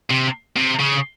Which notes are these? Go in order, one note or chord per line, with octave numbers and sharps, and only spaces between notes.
C3
C3
C#3